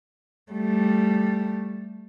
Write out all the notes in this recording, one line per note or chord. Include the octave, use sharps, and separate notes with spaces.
G3 A3